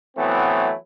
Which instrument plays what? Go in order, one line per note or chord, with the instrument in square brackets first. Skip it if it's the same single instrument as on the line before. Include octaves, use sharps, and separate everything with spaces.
[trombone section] E3 F#3 A3 B3 C4 E4